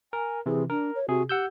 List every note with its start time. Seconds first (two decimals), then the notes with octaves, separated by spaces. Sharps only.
0.13 A#4 G#5
0.46 C3 E3 G#4
0.70 D4 A#4
0.95 C#5
1.08 C3 F#4 G#4
1.29 G4 F#5 E6 G6